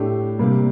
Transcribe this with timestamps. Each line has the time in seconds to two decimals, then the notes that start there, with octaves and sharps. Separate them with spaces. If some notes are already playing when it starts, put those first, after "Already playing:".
Already playing: A2 A3 D4 G4
0.39 C3 G3 A#3